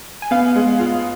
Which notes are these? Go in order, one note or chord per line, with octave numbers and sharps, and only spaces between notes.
G#5
B3 F5
G#3
F4